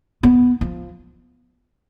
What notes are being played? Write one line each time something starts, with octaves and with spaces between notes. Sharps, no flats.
B3
F3